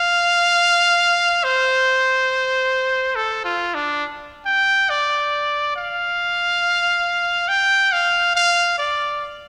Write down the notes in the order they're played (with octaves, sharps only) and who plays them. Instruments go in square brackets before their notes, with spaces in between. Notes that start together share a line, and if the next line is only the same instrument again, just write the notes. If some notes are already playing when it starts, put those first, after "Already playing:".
Already playing: [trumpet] F5
C5
A4
F4
D4
G5
D5
F5
G5
F5
F5
D5